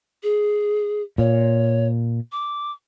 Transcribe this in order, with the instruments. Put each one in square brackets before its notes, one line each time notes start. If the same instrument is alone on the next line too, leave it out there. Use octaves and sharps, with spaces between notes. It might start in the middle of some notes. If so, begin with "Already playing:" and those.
[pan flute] G#4
[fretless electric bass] A#2 [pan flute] C#5
[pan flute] D6